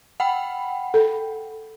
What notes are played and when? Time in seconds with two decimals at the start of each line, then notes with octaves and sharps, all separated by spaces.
0.20 F#5 G5 B5
0.94 A4